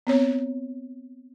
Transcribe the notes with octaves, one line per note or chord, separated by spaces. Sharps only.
B3 C4 C#5